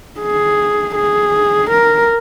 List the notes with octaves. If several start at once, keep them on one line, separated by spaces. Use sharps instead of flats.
G#4
G#4
A#4